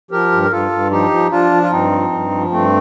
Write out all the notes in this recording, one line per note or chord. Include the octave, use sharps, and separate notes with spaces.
F3 G4 A#4
G2
A#4
G2 F4 A4
G2
F3 D#4 G4
F3
F3 D4 F4
F3
F4
G2 C4 D#4
F3
G2
F3
G2 A3 C4